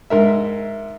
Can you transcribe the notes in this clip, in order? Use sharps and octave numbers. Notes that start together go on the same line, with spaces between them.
G#2 A#4 E5